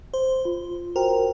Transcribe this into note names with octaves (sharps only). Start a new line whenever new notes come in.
C5
F4
F#4 A#4 C5 G5